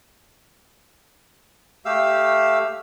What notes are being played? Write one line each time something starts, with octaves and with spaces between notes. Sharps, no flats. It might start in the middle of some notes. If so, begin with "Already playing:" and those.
A3 G4 F5 E6